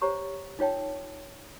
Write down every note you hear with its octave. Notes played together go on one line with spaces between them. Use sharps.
G4 C5 C#5 A#5 C#6
D#4 F4 C#5 G5 A5